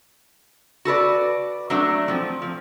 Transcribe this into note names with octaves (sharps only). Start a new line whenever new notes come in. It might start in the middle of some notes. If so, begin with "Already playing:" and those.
F#4 A4 B4 D5
F#3 A3 D4 D5
F3 C4
F3